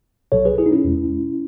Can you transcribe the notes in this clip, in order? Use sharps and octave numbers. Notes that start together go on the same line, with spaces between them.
B1 B2 F#3 A4 C#5
G#4 B4
E4 G#4
D#4
C#4 E4
E2 B2 G#3